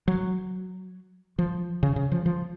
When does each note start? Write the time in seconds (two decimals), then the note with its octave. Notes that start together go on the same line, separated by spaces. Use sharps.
0.08 F#3
1.39 F3
1.83 C#3
1.96 C#3
2.12 F3
2.26 F3